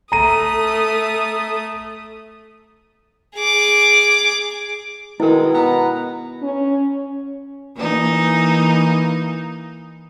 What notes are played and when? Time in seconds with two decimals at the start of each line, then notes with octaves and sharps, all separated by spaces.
0.12 A3 A4 A#5 D#6 D#7
3.35 G#4 D6
5.20 B2 D#3 G#3 E4 A#4
5.53 B3 A#5
6.42 C#4
7.76 E3 A#3 D#4